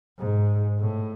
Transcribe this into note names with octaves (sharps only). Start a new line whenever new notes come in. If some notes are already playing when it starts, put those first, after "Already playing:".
G#2
A2